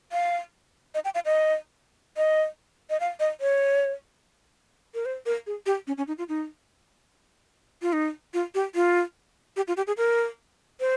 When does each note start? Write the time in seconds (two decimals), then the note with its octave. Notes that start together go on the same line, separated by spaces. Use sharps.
0.12 F5
0.94 D#5
1.05 G5
1.15 F5
1.25 D#5
2.17 D#5
2.90 D#5
3.00 F5
3.20 D#5
3.41 C#5
4.95 A#4
5.05 C5
5.26 A#4
5.47 G#4
5.66 G4
5.87 C#4
5.98 C#4
6.07 D#4
6.18 F4
6.29 D#4
7.82 F4
7.93 D#4
8.34 F4
8.55 G4
8.75 F4
9.56 G4
9.68 F4
9.77 G4
9.87 G#4
9.98 A#4
10.80 C5